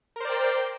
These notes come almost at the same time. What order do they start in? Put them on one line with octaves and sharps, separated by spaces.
A#4 C5 D5 G5